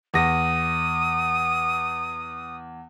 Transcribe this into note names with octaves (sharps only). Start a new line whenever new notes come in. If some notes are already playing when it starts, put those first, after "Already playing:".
E2 D#6 A#6